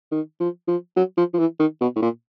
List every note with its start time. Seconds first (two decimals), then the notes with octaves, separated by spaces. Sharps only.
0.12 D#3
0.40 F3
0.68 F3
0.97 F#3
1.17 F3
1.34 F3
1.39 E3
1.59 D#3
1.81 B2
1.96 A2
2.02 A#2